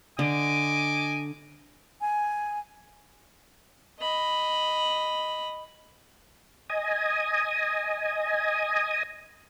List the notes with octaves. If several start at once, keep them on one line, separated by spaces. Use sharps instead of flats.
D3 D#5 G#5 D6
G#5
D#5 B5
D#5 G#5